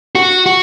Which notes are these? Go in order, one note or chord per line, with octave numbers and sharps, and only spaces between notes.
F#4
F#4